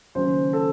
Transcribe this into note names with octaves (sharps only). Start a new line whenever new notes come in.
D#2 C#3 F#3 C#4 C5
A4